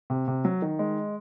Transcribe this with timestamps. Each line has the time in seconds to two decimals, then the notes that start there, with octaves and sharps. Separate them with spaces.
0.10 C3
0.28 C3
0.45 F#3
0.62 D#3
0.79 G#3